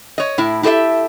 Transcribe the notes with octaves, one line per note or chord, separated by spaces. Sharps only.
C#5 D#5
A2 E4
E4 G4 A4 D#5 E5